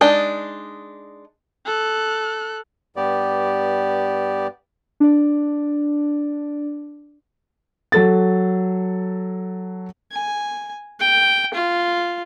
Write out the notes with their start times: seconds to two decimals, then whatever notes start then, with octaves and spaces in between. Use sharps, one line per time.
0.01 G#3 D4 D#4
1.66 A4 F#6
2.96 G2 B3 G4 D5
5.00 D4 D5
7.92 F#3 A4 A6
10.12 G#5
11.00 G5
11.54 F4